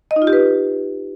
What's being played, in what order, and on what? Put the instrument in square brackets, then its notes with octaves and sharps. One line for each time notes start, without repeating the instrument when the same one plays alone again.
[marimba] D#5
D#4
F4
G4
B4